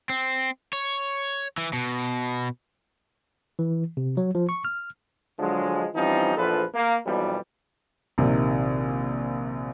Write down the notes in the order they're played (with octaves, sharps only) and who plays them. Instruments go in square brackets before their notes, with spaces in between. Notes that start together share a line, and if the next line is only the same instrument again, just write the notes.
[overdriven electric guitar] C4
C#5
E3
B2
[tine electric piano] E3
C3
F#3
F3
C#6
F6
[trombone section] D3 F3 F#3 G#3
E3 F3 G3 C4 C#4 D#4
A#1 E2 F3 A4 B4
A#3
B1 F2 B2 E3 G3
[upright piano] A#1 C3 D#3